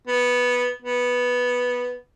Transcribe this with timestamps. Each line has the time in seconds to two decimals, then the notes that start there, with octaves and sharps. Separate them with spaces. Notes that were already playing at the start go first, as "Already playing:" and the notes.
0.07 B3
0.82 B3